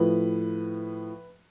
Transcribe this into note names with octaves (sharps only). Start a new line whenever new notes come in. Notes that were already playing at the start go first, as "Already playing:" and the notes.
Already playing: A2 F3 B4